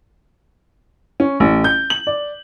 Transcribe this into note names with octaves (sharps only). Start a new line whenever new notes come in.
C#4
A1
G6
F#7
D5